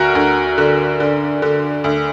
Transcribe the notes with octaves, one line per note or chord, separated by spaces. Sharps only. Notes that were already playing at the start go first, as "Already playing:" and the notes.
Already playing: D2 F#4 A#4
D2
D3
D3
D3
D2